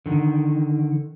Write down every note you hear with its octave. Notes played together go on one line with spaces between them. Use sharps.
D3 D#3